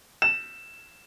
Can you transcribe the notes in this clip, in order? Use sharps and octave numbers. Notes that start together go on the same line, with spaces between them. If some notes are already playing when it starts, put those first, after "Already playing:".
E7